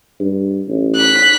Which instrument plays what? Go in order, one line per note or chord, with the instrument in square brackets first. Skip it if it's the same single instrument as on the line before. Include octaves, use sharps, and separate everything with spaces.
[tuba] G2
A1
[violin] F#6 B6